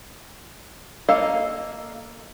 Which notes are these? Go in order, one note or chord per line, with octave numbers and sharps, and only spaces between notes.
A#3 A4 A#4 D#5 F5